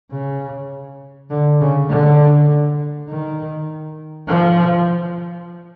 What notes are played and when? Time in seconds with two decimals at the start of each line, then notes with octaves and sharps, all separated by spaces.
0.11 C#3
1.30 D3
1.60 C#3
1.90 D3
3.08 D#3
4.27 F3